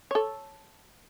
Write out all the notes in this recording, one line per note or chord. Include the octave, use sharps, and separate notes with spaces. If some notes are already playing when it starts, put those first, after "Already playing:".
A4 C#5